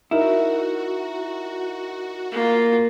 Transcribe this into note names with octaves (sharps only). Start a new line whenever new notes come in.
D#4 E4 F#4 A#4 E5
A#3 F4